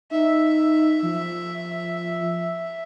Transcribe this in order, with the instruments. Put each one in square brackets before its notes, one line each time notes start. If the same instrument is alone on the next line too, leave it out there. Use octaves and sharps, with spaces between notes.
[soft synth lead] D#4 [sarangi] E5
[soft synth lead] F3